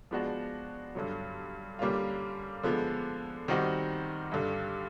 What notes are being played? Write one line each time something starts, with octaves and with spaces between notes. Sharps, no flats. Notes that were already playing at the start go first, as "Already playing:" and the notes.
F3 G#3 B3 D4 F#4
G2 D3 F#3
D3 G3 A#3 C#4 F4
D3 F3 G#3 B3
D#3 G3 C4 D#4 F#4
G2 D3 G3